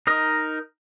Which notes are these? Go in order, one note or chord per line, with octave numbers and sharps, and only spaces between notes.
D#4 A#4 D#5